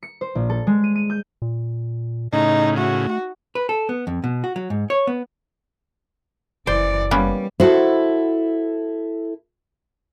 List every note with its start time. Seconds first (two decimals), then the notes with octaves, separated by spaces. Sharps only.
0.03 C#7
0.21 C5
0.35 A#1
0.50 A4
0.67 G#3
0.84 D#7
0.95 D#7
1.10 G6
1.42 A#2
2.33 A2 C#3 D#4
2.78 A3 F#4
3.55 B4
3.69 A4
3.89 B3
4.07 F2
4.24 B2
4.44 F#4
4.56 F#3
4.70 G#2
4.90 C#5
5.07 B3
6.67 F#1 E3 C5 D5
7.11 G3 A#3 B3 C#4
7.60 E4 F#4 A4 C5